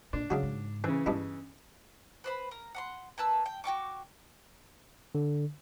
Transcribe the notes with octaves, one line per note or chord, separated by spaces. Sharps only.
A#2 D4
G#2 C#3 F#3 F#4
G#2
C#3 E3 C4
G2 B2 D4 E4
B4 C5 B5
A#4
F#5 A#5 C6
A#3 B4 A5 E6
G5
F#4 G5 C#6 D6
D3